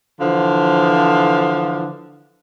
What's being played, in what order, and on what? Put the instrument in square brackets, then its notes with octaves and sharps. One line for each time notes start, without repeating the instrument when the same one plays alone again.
[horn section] D3 E3 F3